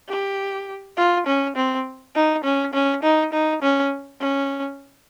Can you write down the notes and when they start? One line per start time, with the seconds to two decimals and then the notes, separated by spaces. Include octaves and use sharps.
0.09 G4
0.97 F4
1.26 C#4
1.56 C4
2.15 D#4
2.44 C#4
2.73 C#4
3.03 D#4
3.33 D#4
3.62 C#4
4.20 C#4